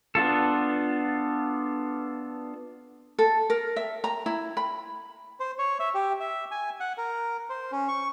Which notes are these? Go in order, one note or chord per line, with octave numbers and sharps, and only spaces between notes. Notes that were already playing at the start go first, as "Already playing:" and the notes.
B3 D4 F4 A4
A4
A#4
E5
A#5
E4
B5
C5
C#5
E5
G4
E5
G#5
F#5
A#4
C5
C#4
C#6